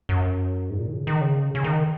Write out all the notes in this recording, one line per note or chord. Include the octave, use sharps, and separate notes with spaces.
F#2
G#2
A#2
D#3
C#3
D#3
C#3
C#3
D#3